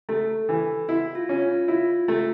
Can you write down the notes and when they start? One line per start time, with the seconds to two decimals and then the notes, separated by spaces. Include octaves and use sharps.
0.09 A3 A4
0.49 E3
0.88 E4 F#4
1.15 F4
1.29 C#4
1.42 F4
1.68 E4 F4
2.08 A3 F4